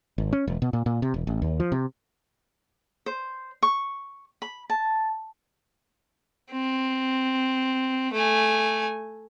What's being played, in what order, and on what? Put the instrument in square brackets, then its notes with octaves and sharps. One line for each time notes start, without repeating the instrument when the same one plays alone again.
[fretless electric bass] G#1
C#4
E1
B2
A#2
A#2
C3
E1
A1
D#2
F3
C3
[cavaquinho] C5
C#6
B5
A5
[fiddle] C4
A3 G#5